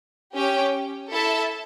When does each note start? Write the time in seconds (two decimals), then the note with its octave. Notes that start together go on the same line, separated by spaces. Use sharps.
0.35 C#4 G4 C#5 G5
1.11 E4 A4 E5 A5